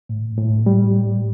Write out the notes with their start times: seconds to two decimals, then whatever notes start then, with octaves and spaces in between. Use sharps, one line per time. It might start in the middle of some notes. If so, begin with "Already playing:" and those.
0.09 A2
0.37 A2
0.66 G3